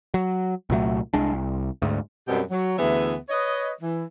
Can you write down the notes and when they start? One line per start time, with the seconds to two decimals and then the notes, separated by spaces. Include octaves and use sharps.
0.14 F#3
0.70 C2 A#2 F#3 A3
1.14 C2 G#3 D4
1.33 C2
1.82 D2 G#2
2.27 F#2 B2 G3 C4 G4
2.50 F#3
2.78 D2 E3 B3 G#4 E5
3.29 B4 C#5 D#5
3.80 E3